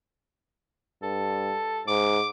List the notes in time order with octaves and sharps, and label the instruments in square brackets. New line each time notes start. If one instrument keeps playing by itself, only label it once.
[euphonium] G2 [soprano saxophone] A4
[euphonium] G#2 [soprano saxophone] D6